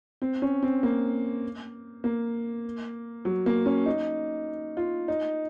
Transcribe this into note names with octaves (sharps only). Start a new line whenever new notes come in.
C4
C#4
C4
A#3
A#3
F#3
A#3
C#4
D#4
F4
D#4